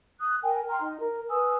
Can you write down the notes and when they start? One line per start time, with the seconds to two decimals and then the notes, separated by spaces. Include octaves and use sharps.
0.20 D#6 F#6
0.43 A#4 G5 G#5
0.69 G5 A#5 C6 F6
0.81 D#4
1.01 A#4
1.30 B4 G#5 D#6 E6